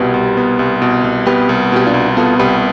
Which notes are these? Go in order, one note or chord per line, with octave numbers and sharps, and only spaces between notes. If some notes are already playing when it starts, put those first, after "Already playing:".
Already playing: C2 B2 B3 G4 B4
C2
B3
C2
B2
C2
B3 G4 B4
C2
B2 G4
D4 F4
C2
B3 F4 A4
C2 G4 B4